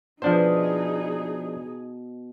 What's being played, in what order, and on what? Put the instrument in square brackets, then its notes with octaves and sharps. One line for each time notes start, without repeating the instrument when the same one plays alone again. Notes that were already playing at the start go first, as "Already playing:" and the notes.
[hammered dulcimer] B2 [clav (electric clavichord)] F3 D4 C5 [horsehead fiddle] D#4 G#4